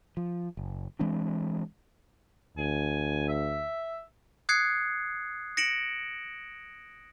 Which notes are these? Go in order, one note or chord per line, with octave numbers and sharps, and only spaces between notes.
F3
F#1
E3 G#3 C4 D4
D2 G#5
E5
D#6 F#6 G#6 C7 C#7
A#6 C#7 D7 E7 F#7